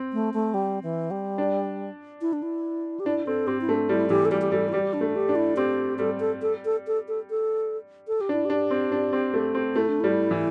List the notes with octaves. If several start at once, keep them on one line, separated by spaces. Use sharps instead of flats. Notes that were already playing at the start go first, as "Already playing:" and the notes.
Already playing: C4
A3
A3
G3
E3
G3
D4
E4
D4
E4
G4
D4 E4
C4 A4
C4 G4
E4
A3 D4
G3 E4
E3 G4
A4
G3 G4
G4
G3 A4
E4
G3 G4
D4
A3
G4
D4
E4
C4 G4
G3 A4
A4
A4
A4
A4
A4
A4
A4
G4
D4
E4
D4 G4
C4
D4
C4
A3
C4
A3 E4
D4
G3 E4
E3